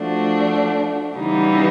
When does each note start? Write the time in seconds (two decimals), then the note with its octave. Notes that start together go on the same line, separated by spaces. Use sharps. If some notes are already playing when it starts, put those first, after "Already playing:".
Already playing: F3 A3 D4 F#4
1.17 C#3 E3 G3 B3 D#4